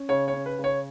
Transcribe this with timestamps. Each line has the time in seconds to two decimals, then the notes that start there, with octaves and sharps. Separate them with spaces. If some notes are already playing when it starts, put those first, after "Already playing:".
Already playing: C#4
0.09 C#3 C#5
0.28 C#5
0.33 C#4
0.46 B4
0.58 C#3
0.64 C#5